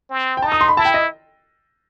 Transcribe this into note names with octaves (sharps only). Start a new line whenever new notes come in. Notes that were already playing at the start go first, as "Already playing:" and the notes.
C4
G5
D#4 A5
D#6
C6
B5
E4 A5
G5
D#5